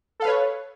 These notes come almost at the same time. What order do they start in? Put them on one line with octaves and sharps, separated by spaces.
A4 F5 B4 C#5